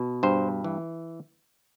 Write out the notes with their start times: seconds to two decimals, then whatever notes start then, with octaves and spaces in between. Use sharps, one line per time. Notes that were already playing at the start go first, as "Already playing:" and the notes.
Already playing: B2
0.23 G2 C5
0.64 E3